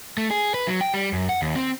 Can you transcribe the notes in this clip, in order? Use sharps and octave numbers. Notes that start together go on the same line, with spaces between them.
A3
G#4
B4
F#3
G5
G3
F#2
F#5
D#2
C4